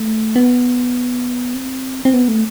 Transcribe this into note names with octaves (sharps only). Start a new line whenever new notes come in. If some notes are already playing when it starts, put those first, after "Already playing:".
Already playing: A3
B3
C4
C4
B3
A3